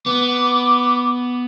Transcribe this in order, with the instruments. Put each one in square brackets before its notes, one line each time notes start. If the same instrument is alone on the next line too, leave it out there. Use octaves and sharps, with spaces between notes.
[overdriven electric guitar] B3 [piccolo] D6